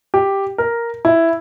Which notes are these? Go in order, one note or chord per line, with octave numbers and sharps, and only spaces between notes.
G4
A#4
E4